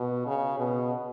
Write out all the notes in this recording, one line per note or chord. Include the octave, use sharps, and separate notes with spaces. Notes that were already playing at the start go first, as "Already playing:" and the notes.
Already playing: B2
C#3
B2